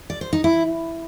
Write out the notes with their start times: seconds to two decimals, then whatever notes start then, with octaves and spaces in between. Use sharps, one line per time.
0.10 D5
0.21 C5
0.33 D#4
0.44 E4